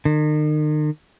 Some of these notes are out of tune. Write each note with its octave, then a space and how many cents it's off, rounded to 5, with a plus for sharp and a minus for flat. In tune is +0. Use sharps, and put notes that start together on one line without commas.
D#3 -40